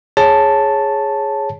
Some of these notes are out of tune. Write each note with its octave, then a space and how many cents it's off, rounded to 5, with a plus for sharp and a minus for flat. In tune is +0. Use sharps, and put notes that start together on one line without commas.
G#4 +0 C#5 -10 A5 +0